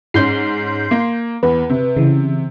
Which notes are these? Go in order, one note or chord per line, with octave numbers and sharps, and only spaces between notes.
G#2 C#4 C6 G6 C7
A#3
E2 B4
C3
C#3 E3